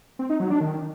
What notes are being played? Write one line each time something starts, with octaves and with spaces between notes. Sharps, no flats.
C4
D#4
F#3
D4
D#3